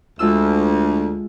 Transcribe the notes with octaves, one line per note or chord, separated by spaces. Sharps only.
D2 G#3 F4 E6